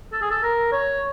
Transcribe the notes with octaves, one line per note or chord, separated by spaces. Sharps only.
A4
G#4
A4
A#4
C#5